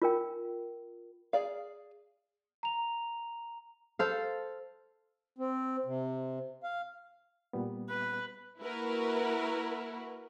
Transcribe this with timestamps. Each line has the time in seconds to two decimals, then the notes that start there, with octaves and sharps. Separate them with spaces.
0.02 F4 A#4 G5
1.33 G#4 D5 F5
2.63 A#5 F7
3.99 A4 C5 F5
5.38 C4
5.85 C3
6.63 F5
7.53 A#2 G3 B3
7.90 B4
8.60 A#3 E4 F#4 A#4 B4